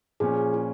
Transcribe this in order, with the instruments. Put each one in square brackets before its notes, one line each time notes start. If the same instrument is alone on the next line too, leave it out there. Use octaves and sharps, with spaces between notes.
[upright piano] A#2 F3 C#4 [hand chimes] G#4
[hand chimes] F4